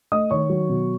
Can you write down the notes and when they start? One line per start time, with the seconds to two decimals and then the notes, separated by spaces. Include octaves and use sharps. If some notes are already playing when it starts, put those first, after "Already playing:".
0.12 A3 D#5 D#6
0.31 D#3 C#5 C#6
0.50 F#3
0.69 B2